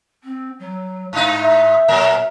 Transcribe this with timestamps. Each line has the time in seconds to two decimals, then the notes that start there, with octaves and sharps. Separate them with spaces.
0.23 C4
0.59 F#3
1.13 G#2 D#4 F5
1.38 E5
1.88 A#2 F#3 A#4